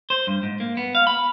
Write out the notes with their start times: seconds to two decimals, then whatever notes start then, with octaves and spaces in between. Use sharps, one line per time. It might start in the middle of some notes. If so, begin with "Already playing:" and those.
0.10 C5
0.27 G2
0.43 G#2
0.60 A#3
0.77 B3
0.95 F5
1.07 B5